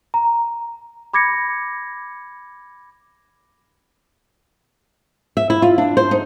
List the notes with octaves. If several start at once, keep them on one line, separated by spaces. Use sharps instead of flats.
A#5
B5 D6 G#6 A#6 C#7
E5
E4
F4
D4
C5
D#4